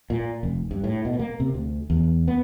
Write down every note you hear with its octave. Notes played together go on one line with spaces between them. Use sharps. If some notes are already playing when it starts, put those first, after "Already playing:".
A#2
F1
G2
A2
B2
A#3
C3
D2
E2
B3